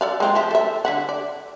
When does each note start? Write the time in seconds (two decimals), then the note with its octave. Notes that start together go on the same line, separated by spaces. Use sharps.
0.01 A4 D5 F5
0.20 G#3 C4 F4
0.35 F3 E5
0.51 A4 E5
0.85 D3 E5 F#5
1.09 D5